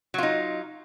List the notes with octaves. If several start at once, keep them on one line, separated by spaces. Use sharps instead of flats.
F#3 D#4 F4